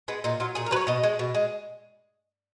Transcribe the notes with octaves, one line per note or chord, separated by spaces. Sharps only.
G#3 B3
A#2 D#4
F#3 F4
A#2 G#4
A#4
F#3 B4
C#5
B2 D#5
G#3
B2
G#3